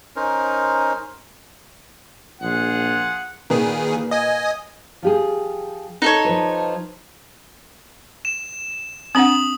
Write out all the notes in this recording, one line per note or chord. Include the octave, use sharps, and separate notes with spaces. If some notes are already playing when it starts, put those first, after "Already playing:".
C#4 D#4 A#4 C5
A#1 F4 G#4 F#5
A#2 D#3 G#4 B4
D#5 G#5
F3 G4 G#4
D#4 A4 C#5
F3 B4
E7
C4 D4 F#5 D#6 F#7